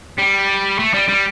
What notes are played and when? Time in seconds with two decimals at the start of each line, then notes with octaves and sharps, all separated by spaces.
0.18 G3
0.79 A3
0.94 G3
1.09 G3